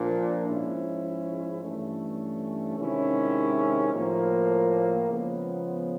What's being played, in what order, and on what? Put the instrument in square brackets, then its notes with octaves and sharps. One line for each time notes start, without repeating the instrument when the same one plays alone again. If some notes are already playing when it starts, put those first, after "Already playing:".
Already playing: [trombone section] A#2 F3 A#3 D4
G#2 F3 G#3 C#4 E4
G2 E3 A3 C#4
C3 D#3 G#3 C#4 E4
A2 F3 A#3
C#3 F3 G#3 B3